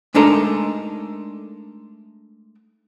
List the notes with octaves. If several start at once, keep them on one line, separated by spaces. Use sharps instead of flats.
G#3 A3 D4 D#4 A4 A#4